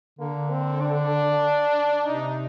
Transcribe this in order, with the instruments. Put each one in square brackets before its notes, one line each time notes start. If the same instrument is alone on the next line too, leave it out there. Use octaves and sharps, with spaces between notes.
[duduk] D3 [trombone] A#3
[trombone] C4
D4
[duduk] C3 [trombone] D#4